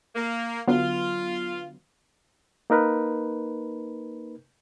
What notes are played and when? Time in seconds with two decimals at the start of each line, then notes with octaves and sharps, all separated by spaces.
0.16 A#3
0.67 D3 F#3 B3 F4
2.70 A#3 D#4 A#4 B4